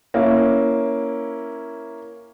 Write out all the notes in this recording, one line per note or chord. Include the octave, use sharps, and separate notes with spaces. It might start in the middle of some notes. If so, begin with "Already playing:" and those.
A#3 C#4 E4